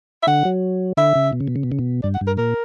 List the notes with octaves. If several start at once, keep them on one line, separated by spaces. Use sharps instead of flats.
E5
D3 F#5
F#3
D3 E5
C#3
B2
C#3
B2
C#3
B2
C#3
B2
G2 D5
F#5
G2
A#4
A#2 A#4